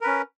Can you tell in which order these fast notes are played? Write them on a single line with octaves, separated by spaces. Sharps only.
A#4 B4 C#4